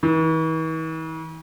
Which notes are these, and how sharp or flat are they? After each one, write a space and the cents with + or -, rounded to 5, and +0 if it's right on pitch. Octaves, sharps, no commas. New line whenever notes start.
E3 -45